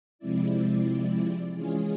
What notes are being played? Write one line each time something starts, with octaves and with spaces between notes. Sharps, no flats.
C3 F3 G#3 C4 E4 D5
E3 G#3 C#4 F4 G#4